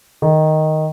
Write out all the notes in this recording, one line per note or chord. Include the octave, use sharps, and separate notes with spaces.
D#3